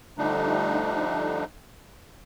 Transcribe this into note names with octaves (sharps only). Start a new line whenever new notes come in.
D3 F3 G3 A3 D4 D#4